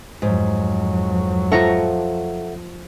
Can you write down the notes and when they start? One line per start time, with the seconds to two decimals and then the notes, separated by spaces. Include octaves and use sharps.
0.22 F2 G#2 F#3
1.52 F3 A4 E5 F#5 A#5 C#6